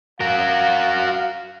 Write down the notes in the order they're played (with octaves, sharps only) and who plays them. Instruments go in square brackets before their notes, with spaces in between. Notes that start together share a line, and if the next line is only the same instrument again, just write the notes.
[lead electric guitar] F#4 A#4 [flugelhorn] F5